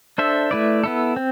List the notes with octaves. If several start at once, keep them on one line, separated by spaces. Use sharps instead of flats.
D4 A4 C5 E5
A3 E4 B4 D5
B3 E4 A4
C4